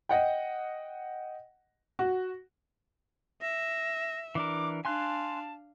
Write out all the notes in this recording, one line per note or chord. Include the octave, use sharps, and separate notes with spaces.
D#5 F#5 G5
F#4
E5 A#6
E3 D4 A#4 D6
D4 F5 G#5 A5 C6 F#6